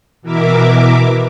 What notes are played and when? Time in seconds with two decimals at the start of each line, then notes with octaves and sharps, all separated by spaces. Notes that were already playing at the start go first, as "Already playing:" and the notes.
0.22 B2 E3 A#4 E5 D6